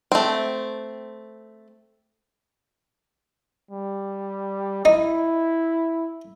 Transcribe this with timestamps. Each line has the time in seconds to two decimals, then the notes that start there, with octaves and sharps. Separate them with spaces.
0.12 A3 C4
3.71 G3
4.85 D#4 E4